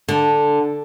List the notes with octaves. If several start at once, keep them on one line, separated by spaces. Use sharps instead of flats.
D3